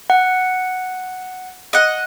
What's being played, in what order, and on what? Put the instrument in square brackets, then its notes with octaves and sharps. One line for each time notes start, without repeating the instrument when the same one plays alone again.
[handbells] F#5
[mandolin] D#5 F#5